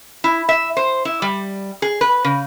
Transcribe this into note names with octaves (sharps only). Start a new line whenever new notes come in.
E4
E5
C5
E4
G3
G#4
B4
C#3